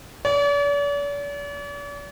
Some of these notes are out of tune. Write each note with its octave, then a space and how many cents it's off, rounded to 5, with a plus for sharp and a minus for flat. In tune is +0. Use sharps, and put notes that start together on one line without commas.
D5 -45